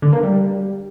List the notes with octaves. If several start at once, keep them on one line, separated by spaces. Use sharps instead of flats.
D3
A#3
G3